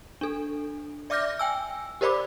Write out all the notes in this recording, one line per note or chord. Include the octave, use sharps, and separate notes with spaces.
D4 A4
D5 E5 D6 F6 G6 A#6
G5 G#5 E6
G4 A#4 C5 D5 B5 D6